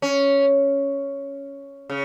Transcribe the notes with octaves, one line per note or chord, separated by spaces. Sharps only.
C#4
C#3